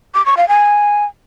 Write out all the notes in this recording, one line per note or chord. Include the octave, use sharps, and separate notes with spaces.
D6
C#6
F5
G#5